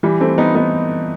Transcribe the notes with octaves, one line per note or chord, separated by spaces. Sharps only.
E3 G3
A3 C4
B3 D#4
B3 D#4